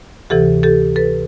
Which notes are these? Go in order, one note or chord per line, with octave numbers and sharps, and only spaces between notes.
D2 C3 E3 G4 A4
G4 A4
A4 B4